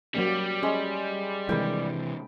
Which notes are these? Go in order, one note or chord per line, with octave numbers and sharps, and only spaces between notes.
F#3 G3 A#3 C#4
G#3 C#4 C#5
C3 D#3 E3 G#3 A#4 G5 B5